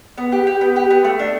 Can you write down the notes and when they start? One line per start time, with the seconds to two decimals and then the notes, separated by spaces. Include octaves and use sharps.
0.18 B3
0.32 G4
0.47 G4
0.61 B3
0.76 G4
0.90 B3
1.04 A3
1.19 D4